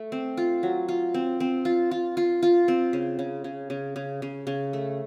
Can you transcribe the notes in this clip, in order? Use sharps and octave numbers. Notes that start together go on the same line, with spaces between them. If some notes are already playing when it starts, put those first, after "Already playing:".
Already playing: A3
C4
F4
F#3
F4
C4
C4
F4
F4
F4
F4
C4
C#3
C#3
C#3
C#3
C#3
C#3
C#3
A3